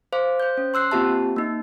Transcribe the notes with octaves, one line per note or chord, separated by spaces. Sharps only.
C5 F5 D6
C5 G6
C#4
C6 E6 F#6 C7
A#3 C4 F4 G4 E5 A5
A#3 D#4